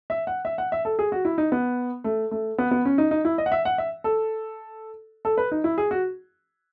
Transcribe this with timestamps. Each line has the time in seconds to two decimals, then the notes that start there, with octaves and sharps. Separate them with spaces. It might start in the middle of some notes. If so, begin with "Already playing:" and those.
0.10 E5
0.27 F#5
0.45 E5
0.58 F#5
0.72 E5
0.85 A4
0.99 G#4
1.12 F#4
1.25 E4
1.38 D#4
1.52 B3
2.04 A3
2.31 A3
2.58 B3
2.71 B3
2.85 C#4
2.98 D#4
3.11 D#4
3.25 E4
3.38 D#5
3.46 F#5
3.52 E5
3.65 F#5
3.78 E5
4.04 A4
5.25 A4
5.37 B4
5.52 D#4
5.64 E4
5.78 G#4
5.91 F#4